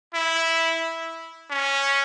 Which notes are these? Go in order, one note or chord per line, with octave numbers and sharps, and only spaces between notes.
E4
C#4